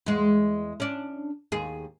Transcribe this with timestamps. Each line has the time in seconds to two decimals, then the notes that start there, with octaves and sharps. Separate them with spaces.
0.06 E2 G#3
0.80 C#4 D4
1.52 D#2 G#4